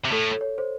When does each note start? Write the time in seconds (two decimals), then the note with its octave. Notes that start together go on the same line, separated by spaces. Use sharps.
0.05 C3
0.12 A2 A4
0.41 C#5
0.58 C5